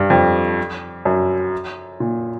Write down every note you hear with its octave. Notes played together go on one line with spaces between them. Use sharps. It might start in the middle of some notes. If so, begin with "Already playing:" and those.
Already playing: G2
F2
F#2
A#2